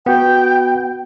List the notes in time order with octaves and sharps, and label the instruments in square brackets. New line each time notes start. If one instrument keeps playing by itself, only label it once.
[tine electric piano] B3 F#4 [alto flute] G5